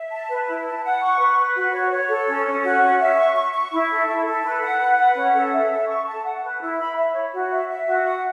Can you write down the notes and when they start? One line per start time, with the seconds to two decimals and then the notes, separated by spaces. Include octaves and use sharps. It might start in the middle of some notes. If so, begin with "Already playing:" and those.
Already playing: E5
0.11 A5
0.29 B4
0.47 E4
0.65 A5
0.84 F#5
1.02 C#6
1.19 B4
1.38 B4
1.56 F#4
1.74 C#5
1.91 C#5
2.09 A4
2.27 C#4
2.45 C#4
2.64 F#4
2.82 C#4
3.00 E5
3.18 C#6
3.36 C#6
3.53 C#6
3.72 E4
3.90 A4
4.07 E4
4.26 A4
4.44 B4
4.62 F#5
4.81 B4
4.98 F#5
5.16 C#4
5.34 A4
5.53 E5
5.71 A4
5.88 C#6
6.06 A5
6.25 F#5
6.42 B4
6.61 E4
6.79 B5
6.96 E5
7.14 C#5
7.33 F#4
7.51 E5
7.69 E5
7.87 F#4
8.05 F#5